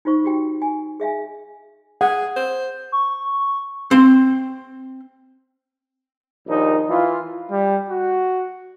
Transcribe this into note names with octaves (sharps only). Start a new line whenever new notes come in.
D#4 F4 C5 C#6
F#4 G4 G5
G#5
G#4 E5 F5 G#5
G#4 F#5
C5
C#6
C4 C6
A#1 D#2 D#4
E3 F4
G3
F#4